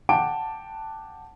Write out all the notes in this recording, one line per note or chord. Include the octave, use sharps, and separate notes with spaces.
F#5 G5 A5 D6 D7